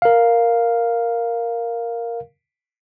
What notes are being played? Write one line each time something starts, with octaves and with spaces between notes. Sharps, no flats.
A#4 F5